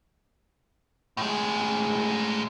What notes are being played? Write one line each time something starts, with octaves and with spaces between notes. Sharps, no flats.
A2 G#3